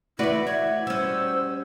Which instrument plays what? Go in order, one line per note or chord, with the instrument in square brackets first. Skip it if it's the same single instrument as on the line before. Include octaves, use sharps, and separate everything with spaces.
[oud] E2 B4 [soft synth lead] A3 [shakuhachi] E4 [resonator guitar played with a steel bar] F#4 D5
[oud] C#5 [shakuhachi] E5 [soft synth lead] G#6
[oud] G3 C#4 [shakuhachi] C5 [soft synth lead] E6